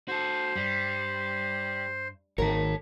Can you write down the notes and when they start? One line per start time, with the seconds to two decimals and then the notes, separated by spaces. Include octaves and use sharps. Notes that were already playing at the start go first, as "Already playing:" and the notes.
0.08 F#4 A4 C5
0.55 G2 G3
2.38 G#1 D#3 A#4 C#5 A5